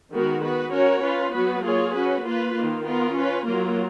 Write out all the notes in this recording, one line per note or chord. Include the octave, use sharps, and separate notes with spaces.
D#3 G#3 B3 F#4 A#4
B3 F#4 B4
C#4 F#4 A#4 C#5
C#4 F4 B4
F#3 B3 F#4 B4
A#3 F4 G#4 C#5
C#4 F#4 B4
A#3 F4 B4
D#3 A#3 F4
B3 F4 A#4
C#4 F4 B4
F#3 A#3 F4 A#4